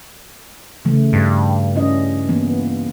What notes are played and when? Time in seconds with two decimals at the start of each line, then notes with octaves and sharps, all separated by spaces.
0.85 C#3 E3 A3
1.13 G2
1.76 C#4 E4 D#5
2.29 E3 A#3 B3